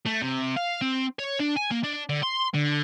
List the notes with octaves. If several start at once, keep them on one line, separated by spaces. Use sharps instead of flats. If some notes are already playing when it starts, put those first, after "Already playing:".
A3
C3
F5
C4
C#5
D4
G#5
A#3
D4
D3
C6
D3